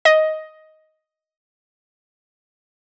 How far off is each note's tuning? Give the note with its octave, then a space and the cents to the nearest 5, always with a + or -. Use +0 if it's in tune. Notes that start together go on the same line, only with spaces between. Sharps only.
D#5 +5